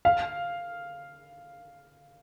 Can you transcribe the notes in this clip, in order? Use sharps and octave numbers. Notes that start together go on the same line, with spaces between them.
F5